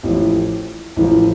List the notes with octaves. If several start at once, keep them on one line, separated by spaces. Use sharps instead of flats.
A1 A2 F3
A1 A2 F3